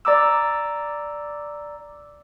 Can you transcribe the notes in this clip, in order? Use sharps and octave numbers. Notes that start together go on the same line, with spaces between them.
D5 A#5 D6 E6